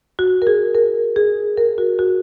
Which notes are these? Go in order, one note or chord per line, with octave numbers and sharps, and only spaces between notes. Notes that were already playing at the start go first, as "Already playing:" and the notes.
F#4
A#4
G#4
A#4
G#4
A#4
F#4
F#4